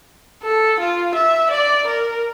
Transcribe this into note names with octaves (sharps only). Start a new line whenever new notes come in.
A4
F4
E5
D5
A#4